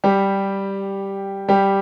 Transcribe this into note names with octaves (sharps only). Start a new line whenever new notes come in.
G3 G4
G3 G4